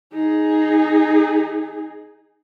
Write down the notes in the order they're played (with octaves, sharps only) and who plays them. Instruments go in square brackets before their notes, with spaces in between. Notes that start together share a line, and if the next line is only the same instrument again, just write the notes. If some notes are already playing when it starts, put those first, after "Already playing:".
[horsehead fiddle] D#4 G#4